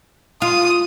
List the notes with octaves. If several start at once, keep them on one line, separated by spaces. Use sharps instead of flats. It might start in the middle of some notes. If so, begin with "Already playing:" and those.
F4 D#6